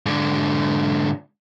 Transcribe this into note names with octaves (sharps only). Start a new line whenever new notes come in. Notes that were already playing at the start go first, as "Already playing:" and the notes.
G#2 D3